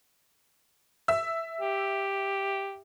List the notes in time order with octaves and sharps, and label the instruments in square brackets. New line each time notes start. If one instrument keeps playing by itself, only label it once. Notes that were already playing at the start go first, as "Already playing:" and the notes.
[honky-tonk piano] E5 E6
[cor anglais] G4